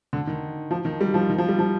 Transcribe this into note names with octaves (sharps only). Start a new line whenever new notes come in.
D3
D#3
F3
D#3
G3
F3
D#3
F3
G3
F3